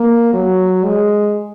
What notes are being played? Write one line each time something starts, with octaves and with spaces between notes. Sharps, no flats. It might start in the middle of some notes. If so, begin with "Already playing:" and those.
Already playing: A#3
F#3
G#3